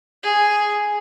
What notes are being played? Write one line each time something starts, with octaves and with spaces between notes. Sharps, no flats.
G#4